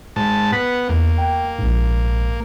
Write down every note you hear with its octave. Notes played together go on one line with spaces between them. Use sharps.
G#2 A5
B3 F#5 B6
E2 A#3
G5
A#1 G#2